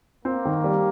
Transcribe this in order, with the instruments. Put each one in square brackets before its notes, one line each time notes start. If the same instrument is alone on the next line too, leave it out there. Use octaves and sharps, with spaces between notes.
[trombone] A#3 [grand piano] C4
[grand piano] D#3
G3